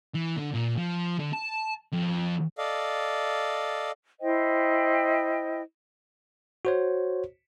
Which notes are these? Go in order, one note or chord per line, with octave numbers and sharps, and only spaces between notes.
E3
D3
A#2
F3
D3
A5
F2
A4 D5 D#5 F5
E4 C5 D#5 G5
F#4 C5 C#5